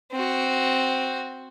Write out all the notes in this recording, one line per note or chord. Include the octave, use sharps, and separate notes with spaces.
C4 F#4